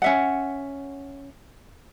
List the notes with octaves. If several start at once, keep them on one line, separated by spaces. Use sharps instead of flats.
C#4 E5 F#5